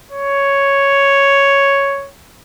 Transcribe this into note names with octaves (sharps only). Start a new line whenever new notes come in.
C#5